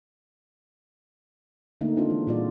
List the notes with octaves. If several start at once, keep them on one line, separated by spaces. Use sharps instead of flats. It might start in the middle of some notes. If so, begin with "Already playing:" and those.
D3 A3 A#3 D#4
C4 D4 F4
E3 G#3
A#2 G3 F4 F#4 D5